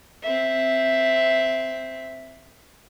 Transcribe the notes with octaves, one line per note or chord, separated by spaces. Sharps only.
C4 E5